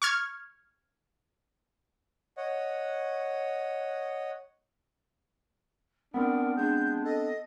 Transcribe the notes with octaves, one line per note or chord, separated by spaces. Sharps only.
C#6 F6 G#6
C#5 D#5 F#5
B3 C4 D4 A#4
G#3 D4 G6
A4 D#5